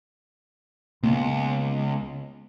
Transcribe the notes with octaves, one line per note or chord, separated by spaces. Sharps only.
C#2 A#3 B3